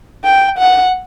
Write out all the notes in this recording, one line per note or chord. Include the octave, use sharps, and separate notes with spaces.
G5
F#5